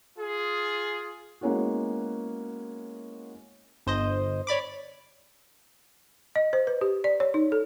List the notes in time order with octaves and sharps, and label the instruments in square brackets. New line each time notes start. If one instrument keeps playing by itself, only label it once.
[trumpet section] F4 G#4
[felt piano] G#3 A#3 B3 C#4 E4 F#4
[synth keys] G1 C5 D#5
C#5 D5 B5 D6
[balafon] D#5
C5
B4
G4
D5
C#5
D#4
A4